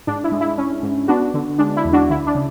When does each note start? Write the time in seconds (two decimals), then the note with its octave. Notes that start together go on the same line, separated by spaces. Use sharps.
0.07 G#2 D4
0.24 E4
0.32 G#3
0.41 E4
0.58 C#4
0.83 G#2
1.08 B3 D4 F#4
1.34 D3
1.59 G#3 D4
1.77 E4
1.85 E2
1.93 D4 F#4
2.10 D2 E4
2.26 D4
2.35 C#3